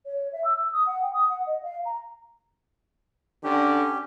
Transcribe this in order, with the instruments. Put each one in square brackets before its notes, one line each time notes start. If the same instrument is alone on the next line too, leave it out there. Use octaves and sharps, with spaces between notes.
[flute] C#5
E5
E6
E6
D#6
F#5
G5
D#6
F#5
D#5
F5
A#5
[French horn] D3 [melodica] C#4 G4